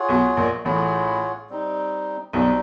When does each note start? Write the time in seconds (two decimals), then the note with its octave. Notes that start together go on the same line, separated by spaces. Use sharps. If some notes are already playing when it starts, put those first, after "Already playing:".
Already playing: F4 G#4 C#5 F#5
0.09 B1 B2
0.37 A#1 A#2
0.65 A1 A2 F4 G#4 C#5 F#5
1.50 G3 C4 D#4
2.33 B1 B2 G3 C4 D#4